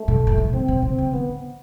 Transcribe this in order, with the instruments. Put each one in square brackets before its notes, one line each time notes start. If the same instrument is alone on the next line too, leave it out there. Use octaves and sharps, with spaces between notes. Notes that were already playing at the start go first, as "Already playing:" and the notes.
Already playing: [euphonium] A3
[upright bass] B2
A#2
B2
[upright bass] C3 [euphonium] C4
[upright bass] B2
[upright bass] C3 [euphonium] C4
[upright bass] C#3
[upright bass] D3 [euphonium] B3